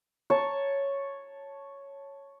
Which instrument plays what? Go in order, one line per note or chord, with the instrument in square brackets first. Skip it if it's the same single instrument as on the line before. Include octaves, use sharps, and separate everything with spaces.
[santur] C#5 A5